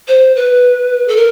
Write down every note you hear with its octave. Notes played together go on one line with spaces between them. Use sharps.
C5
B4
A4
A#4